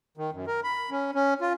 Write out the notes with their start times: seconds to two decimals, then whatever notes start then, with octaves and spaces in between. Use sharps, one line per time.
0.17 D#3
0.33 F#2
0.47 A#4
0.64 B5
0.91 C#4
1.15 C#4
1.41 F4